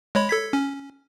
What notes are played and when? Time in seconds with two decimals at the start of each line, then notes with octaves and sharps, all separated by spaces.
0.15 G#3 C#5 B5
0.29 A4 G#6 B6
0.53 C#4